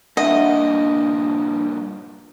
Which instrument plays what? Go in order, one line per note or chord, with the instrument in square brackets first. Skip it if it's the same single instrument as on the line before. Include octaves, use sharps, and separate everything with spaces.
[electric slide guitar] G2 A#2 [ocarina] D4 [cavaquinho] D#5 [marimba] E5 F#5